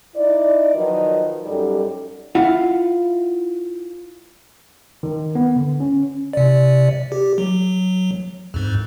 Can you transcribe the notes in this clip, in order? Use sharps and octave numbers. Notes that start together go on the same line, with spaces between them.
D#4 E4 D5
D#3 F3 F#3 B4 D#5
F#2 G3 D#4 G4 A4
E4 F4 F5 F#5
D#3
B3
D3
C#4
C3 D5
G4
F#3
F2 G#2